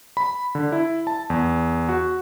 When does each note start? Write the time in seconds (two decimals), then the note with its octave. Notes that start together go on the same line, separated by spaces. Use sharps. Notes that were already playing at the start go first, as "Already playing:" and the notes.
0.17 B5
0.55 D3
0.72 E4
1.07 A5
1.30 E2
1.89 F#4